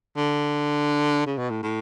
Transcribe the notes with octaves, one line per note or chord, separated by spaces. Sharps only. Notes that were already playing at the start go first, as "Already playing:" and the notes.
D3
C#3
B2
A2
A2